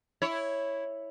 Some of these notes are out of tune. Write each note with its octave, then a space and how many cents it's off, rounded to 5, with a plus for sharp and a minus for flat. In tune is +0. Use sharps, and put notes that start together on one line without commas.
E4 +0 C#5 +0